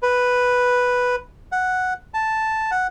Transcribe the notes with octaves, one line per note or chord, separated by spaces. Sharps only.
B4
F#5
A5
F#5